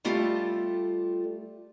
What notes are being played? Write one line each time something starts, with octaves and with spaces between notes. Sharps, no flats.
G3 A3 F4 G4 A4